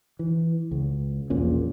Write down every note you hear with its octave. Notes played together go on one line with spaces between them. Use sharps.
E3
C#2
E1 A#1 A#2 C#4